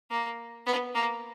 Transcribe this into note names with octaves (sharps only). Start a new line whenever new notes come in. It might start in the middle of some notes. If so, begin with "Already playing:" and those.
A#3
B3
A#3